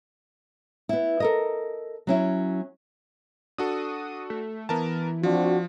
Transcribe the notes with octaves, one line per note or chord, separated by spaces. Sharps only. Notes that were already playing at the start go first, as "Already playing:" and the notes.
B3 E4
A4 A#4 D#5
F#3 C#4 E4
D4 F#4 A4 D#6
A3
E3 B3 A#4 A5
F3 C4 D4 F#4